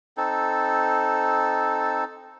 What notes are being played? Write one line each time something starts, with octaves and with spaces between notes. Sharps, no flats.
C4 D#4 A4